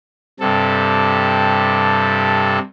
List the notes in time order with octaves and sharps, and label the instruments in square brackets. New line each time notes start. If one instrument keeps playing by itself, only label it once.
[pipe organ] G2 C3 A4